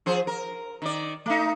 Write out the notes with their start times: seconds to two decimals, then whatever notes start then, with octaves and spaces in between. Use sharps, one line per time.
0.06 F3 G#4 C5
0.27 A#4
0.82 D#3 D5
1.26 A3 D#4